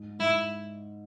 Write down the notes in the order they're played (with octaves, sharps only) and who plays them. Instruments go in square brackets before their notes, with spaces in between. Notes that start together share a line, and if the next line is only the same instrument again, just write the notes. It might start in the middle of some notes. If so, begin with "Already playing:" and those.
Already playing: [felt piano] G#2
[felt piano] G#2 [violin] E4